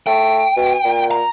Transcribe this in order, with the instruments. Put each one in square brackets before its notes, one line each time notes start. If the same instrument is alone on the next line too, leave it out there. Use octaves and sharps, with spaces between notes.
[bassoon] A3 [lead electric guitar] G5
[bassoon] B2
A#2
[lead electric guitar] A#5